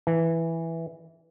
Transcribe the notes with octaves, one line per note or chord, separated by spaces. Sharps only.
E3